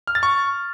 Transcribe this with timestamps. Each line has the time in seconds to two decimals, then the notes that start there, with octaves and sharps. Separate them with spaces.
0.07 F6
0.15 A6
0.23 C#6